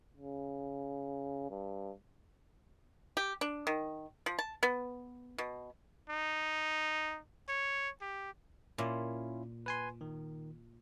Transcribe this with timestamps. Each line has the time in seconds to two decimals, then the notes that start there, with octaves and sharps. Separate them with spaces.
0.17 C#3
1.50 G2
3.17 G4
3.41 D4
3.67 D#3
4.26 F3
4.39 A5
4.63 B3
5.38 B2
6.09 D#4
7.48 C#5
8.01 G4
8.78 A#2 C#4 E4 F4
9.66 B4 G#5 C6
10.01 D#3